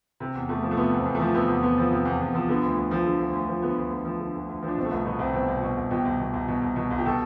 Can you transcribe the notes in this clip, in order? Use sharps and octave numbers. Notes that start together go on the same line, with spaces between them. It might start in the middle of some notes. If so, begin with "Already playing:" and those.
C3
E2
E2 A3
F3
A3
C3 B3
E2 C4
E2
A3
F3
C3 B3
E2
E2 B3
F3
C3
E2
E2
F3
D3 B3
D2
D2
F3
D3
D2
D2
F3
D3 B3
D2
D2
F3
D3
D2
D2
F3
D4
B2 C4
A3
C2 B3
B2 B3
C2 C4
B2 C4
C2
B2
C2
B2 G4
C2
B2
C2
B2
C2
B2
C2
G4
B2 A4